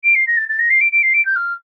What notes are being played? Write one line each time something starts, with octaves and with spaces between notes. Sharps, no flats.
D7
C7
A#6
A6
A6
A#6
C7
D7
D7
C7
D7
G6
F6